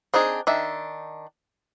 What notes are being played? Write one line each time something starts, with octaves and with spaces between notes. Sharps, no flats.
C4 D4 D#4 G#4
D#3 D4 E5